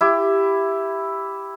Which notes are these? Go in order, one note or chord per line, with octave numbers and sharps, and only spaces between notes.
E4 G4